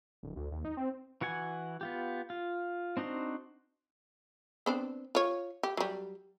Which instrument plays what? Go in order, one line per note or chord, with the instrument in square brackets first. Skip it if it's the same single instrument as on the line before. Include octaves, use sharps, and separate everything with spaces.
[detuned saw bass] D1
D2
D#2
D#4
C4
[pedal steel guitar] E3 F#4 F#5 G#5
B3 F4 G4
F4
C4 D4 D#4 F#4 C5
[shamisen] B3 C4 D4
F4 C#5
G4
F#3 G3